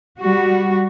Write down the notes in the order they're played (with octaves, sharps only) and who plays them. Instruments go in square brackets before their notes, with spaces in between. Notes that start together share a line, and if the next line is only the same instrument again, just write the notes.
[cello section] G3 F#4